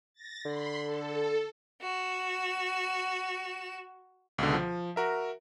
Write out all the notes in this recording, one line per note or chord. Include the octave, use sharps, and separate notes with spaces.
A6 A#6
D3 B5 C6
A4
F#4 E7
C#2 B2 D3
F3
F#4 A#4 E5